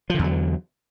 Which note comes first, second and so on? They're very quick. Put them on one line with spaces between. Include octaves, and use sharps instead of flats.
F3 D3 E2 F#3